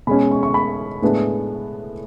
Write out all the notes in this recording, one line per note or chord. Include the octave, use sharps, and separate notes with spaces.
B2 G#3 C#4 B5
C#6
C#6
B5
A2 G#3 B3 D4